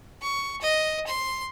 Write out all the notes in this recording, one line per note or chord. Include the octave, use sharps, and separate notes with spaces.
C#6
D#5
C6